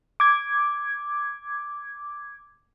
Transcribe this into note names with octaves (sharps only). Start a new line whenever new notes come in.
D6 G#6